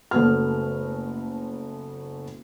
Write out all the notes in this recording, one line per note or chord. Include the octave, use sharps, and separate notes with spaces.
F#1 A3 B3 F#4 F6